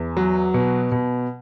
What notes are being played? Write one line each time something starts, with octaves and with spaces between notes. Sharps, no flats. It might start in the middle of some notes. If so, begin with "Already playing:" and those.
Already playing: E2
F#3
B2
B2